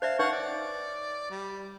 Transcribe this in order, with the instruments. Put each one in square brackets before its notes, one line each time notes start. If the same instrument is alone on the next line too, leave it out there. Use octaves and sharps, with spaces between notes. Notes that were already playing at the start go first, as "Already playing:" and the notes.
[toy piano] C5 D5 E5 [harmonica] F5 A5
[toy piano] D#4 B4 C#5 [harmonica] F5 F#5 C#6
[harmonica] D5
G3